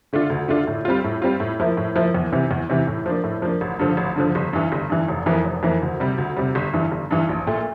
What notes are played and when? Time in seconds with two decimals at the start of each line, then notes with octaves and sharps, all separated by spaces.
0.13 D3 A3 D4 F4
0.30 D2
0.48 D3 A3 D4 F4
0.68 A2
0.85 G3 C4 F4
1.04 A2
1.22 G3 C4 F4
1.40 A2
1.59 F3 A#3 E4
1.77 A2
1.96 F3 A#3 E4
2.15 E2
2.32 C3 E3
2.51 E2
2.70 C3 E3
2.87 A2
3.06 F3 A#3 D4
3.24 A2
3.42 F3 A#3 D4
3.61 A1
3.79 G2 D3 F3
3.97 A1
4.16 G2 D3 F3
4.35 G1
4.53 G2 E3
4.72 G1
4.90 G2 E3
5.08 F1
5.26 F2 E3 A#3
5.44 F1
5.63 F2 E3 A#3
5.82 D2
6.00 C3 G3
6.18 D2
6.36 C3 G3
6.55 G1
6.74 G2 E3
6.92 G1
7.11 G2 E3
7.29 A#1
7.47 A#2 A3